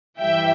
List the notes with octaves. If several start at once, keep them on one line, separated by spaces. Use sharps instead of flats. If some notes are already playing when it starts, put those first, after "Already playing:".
G2 E3 G3 E5 G5